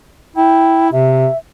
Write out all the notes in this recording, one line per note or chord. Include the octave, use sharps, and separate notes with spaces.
E4 G5
C3 E5